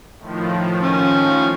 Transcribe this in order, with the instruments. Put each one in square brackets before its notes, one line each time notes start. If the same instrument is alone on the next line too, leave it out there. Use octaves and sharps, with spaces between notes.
[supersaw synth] A2 D#3 F3
[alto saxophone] C#4